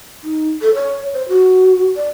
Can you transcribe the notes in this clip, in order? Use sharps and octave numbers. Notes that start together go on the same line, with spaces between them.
D#4
A4
C#5
C5
F#4
D5